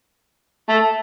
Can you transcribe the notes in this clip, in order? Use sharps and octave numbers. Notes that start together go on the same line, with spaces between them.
A3